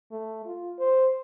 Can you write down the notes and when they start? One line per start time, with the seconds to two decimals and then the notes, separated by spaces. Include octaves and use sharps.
0.11 A3
0.45 F4
0.79 C5